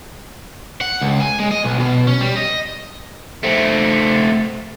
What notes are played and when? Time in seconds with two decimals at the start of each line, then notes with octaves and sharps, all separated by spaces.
0.81 F#5
1.01 C#2
1.21 G#5
1.40 G#3
1.52 D#5
1.64 B1
1.79 B2
2.08 C#4
2.21 G3
2.37 D#5
3.43 A3 C4